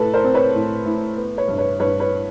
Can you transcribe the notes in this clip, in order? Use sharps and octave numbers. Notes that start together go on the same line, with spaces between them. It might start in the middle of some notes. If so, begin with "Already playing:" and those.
Already playing: A2 A4 B4
A#4 C5
C4
B4 C#5
A2
A2
B3
B4 C#5
G2
B4 C#5
G2 B4 C#5
B4 C#5